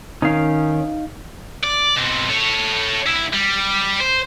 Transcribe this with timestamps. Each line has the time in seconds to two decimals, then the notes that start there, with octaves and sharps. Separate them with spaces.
0.22 D#3 C#4 D#4 F5
1.64 D5
1.96 B2 C4
2.29 A4 C#5
3.06 D2 E4
3.33 G3
4.00 C5